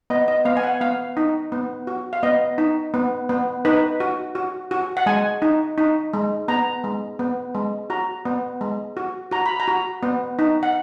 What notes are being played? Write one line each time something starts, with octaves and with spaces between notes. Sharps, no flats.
B3 D#5
D#5
B3 F5
G#5
F#5
B3 F5
D#4
B3
F#4
F5
B3 D#5
D#4
B3
B3
D#4 B4
F#4
F#4
F#4
F#5
G#3 G#5
D#4
D#4
G#3
B3 A#5
G#3
B3
G#3
F#4 A#5
B3
G#3
F#4
F#4 A#5
B5
A#5
F#4
B3
D#4
F#5